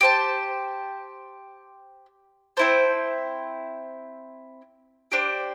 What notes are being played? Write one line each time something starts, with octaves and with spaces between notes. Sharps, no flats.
G4 C5 A5
C4 E4 C5 A5
D4 G4 C5